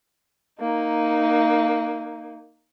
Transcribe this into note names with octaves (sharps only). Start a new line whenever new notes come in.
A#3 D#4